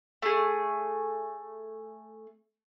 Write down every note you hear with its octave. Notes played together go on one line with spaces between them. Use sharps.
A3 G#4